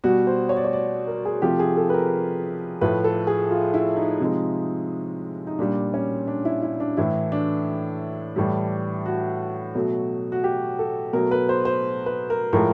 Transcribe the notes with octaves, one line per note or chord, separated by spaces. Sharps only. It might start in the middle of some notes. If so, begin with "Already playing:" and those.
B2 G3 F#4
C5
C#5
D5
C#5
D5
A#4
G#4
C3 F3 A3 G4
G#4
A4
B4
A#4
A2 F3 A3 B4
A4
G#4
F4
E4
D#4
C3 F3 G#3
D#4
A#2 G3 D4
C#4
D4
E4
E4
D4
A2 E3 A3 E4
D4
A2 E3 G3
F#4
B2 F#3 A3
F#4
G4
A4
B2 F#3 A3 A#4
B4
C5
C5
B4
A#4
A2 F3 G#3 A#4